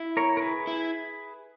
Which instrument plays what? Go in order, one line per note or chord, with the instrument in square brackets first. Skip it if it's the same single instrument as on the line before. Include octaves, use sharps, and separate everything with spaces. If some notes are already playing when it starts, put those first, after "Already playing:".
Already playing: [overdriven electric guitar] E4
[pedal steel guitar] A#4 C#5
A#4
G#4 B4
[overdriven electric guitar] E4